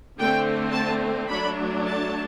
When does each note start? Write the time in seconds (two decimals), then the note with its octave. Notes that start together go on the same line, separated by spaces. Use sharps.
0.18 D3 A3 C4 G5
0.72 A5
1.29 F#3 A3 D4 B5
1.83 A5